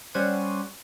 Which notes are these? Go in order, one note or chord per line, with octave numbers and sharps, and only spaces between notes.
G3 C#4 C5 F#5 C#6 D#7